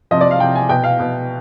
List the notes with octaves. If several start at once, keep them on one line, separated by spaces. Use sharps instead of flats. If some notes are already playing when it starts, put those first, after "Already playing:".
C3 F3 D#5
D5
F5
C3 F3 G5
G#5
B2 G5
F5
B2